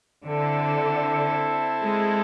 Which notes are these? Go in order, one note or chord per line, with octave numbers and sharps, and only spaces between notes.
D3 C4 E4 A4
G#3